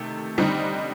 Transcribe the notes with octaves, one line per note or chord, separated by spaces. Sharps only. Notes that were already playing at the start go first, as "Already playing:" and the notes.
Already playing: C3 D#3 A3
D3 G3 C4 D#4